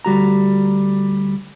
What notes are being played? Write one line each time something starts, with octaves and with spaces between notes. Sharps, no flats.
D2 G3 F#4 A#5